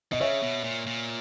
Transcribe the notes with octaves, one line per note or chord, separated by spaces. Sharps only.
B2 D#5
C#3 C#5 E5
B2
A#2
A#2